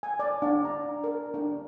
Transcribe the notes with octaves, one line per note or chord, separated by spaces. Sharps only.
G#5
D5
D4
A#5
A#4
D4